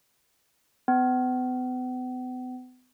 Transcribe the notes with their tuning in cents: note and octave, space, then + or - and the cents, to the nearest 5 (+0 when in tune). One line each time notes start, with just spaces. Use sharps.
B3 +40